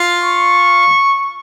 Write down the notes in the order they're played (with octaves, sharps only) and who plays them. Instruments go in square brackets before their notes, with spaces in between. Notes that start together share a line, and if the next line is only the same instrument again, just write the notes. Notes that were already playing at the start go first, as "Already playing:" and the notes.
Already playing: [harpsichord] F4
[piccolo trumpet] C#6